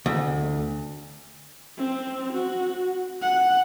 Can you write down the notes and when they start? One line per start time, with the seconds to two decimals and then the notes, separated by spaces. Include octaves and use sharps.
0.06 D2
1.77 C4
2.33 F#4
3.21 F#5